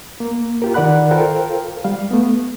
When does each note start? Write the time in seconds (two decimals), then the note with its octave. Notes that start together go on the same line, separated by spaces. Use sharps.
0.20 A#3
0.62 F4 G4 A#4
0.74 D#3 A#4 D5 F#5 B5 F#6
1.11 F4 A4 A#4 C5 F5 G5
1.84 G3 F5
2.11 A3 B3